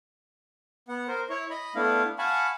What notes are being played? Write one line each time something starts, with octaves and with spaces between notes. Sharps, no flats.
B3 F#5
A#4 C5
E4 C#5 C#6
D#5 B5
A3 B3 D4 E4 F5
F5 F#5 G#5 A5 B5 C#6